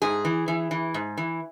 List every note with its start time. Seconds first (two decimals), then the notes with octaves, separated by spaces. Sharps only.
0.02 G#2 G#4
0.25 E3
0.48 E3
0.71 E3
0.94 G#2
1.17 E3